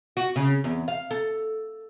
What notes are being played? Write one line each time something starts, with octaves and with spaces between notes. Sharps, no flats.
F#4
C#3
E2
F5
A4